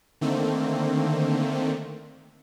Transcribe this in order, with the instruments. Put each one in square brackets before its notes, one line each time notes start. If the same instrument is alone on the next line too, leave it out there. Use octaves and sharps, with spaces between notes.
[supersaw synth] D3 D#3 A3 A#3 C4